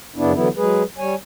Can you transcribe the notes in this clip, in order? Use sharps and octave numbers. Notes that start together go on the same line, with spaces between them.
F#2 C#3 B3 D4 E4
D3 E3 F#3 B3 E4
F#3 G#3 G#4 B4
G3 C#5 G#5